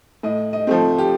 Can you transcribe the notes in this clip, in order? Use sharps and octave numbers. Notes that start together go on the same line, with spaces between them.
A2 D#5
D#5
F3 A3 C4
G4